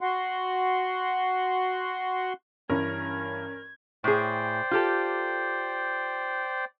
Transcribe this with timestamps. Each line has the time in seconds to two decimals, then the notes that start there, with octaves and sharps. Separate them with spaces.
0.01 F#4 F#5 C6
2.70 G2 E3 C#4 A#4 G#6
4.04 A2 G#4 C5 D5 G5
4.71 F4 G4 A4